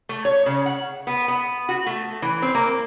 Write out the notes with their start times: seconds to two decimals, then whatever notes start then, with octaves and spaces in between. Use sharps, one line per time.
0.09 A3
0.25 C#5
0.46 C#3
0.66 F#5
1.07 B3
1.28 B3
1.69 F#4
1.87 A3
2.22 E3
2.42 C4
2.55 A#3